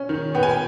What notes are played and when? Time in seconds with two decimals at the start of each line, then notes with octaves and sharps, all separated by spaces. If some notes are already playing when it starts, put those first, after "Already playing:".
Already playing: C#4
0.09 D#3
0.35 B3 G5
0.43 G#5
0.51 G5